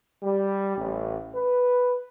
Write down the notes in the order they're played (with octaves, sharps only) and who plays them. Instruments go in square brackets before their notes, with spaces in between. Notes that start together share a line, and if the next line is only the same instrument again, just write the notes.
[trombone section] G3
A1
B4